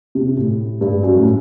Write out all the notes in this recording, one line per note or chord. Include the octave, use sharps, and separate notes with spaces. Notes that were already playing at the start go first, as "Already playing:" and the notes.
C3
A2
G2
F#2
A2